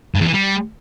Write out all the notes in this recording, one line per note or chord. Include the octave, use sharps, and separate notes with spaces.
G2
E2
E3
G3